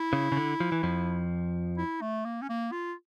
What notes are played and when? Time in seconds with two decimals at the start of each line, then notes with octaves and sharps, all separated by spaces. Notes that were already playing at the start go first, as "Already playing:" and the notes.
Already playing: E4
0.13 C#3
0.32 C#3
0.37 D3
0.60 F3
0.72 E3
0.83 F2 F3
1.78 E4
2.01 A3
2.25 A#3
2.42 C#4
2.49 A#3
2.72 F4